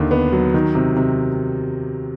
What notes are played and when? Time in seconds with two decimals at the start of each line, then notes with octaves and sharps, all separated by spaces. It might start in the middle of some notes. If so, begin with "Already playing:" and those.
Already playing: D#2 D3
0.11 B3
0.33 F#3
0.54 D#3
0.75 C3
0.96 C3